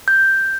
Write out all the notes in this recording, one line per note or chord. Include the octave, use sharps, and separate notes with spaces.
G6